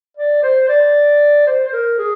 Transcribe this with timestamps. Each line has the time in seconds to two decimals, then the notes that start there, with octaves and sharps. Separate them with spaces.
0.17 D5
0.43 C5
0.69 D5
1.47 C5
1.67 C5
1.73 A#4
1.99 G#4